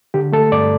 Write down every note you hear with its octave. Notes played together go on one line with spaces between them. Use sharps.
D3 G4
A3 A4
G2 D5